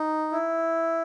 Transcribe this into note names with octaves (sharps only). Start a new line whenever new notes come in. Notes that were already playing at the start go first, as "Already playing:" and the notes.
Already playing: D#4
E4